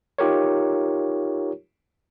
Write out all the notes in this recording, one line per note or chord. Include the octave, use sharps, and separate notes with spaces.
D#4 F4 G4 A#4 C#5